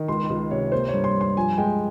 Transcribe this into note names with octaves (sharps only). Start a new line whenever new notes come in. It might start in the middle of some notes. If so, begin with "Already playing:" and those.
Already playing: D#3
C#2 C6
C#2
C3 C#5
A#3 C5
G2 C#5
C6
G2
C6
F3 G#5
G#3 G5